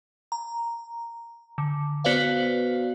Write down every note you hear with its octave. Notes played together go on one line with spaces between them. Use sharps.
A#5
D3
B3 F#4 B4 C5 D5 F5